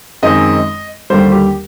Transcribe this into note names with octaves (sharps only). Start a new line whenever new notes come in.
F#2 D#3 G#3 C4 D#4 D#5
D#2 D3 G3 C5
G4